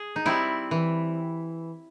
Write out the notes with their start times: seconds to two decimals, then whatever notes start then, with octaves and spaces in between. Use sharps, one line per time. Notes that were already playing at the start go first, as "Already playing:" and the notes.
Already playing: G#4
0.16 D#4
0.25 G3 C4 E4
0.71 E3